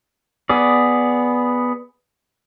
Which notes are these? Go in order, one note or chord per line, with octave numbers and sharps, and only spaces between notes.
B3 G#4 D5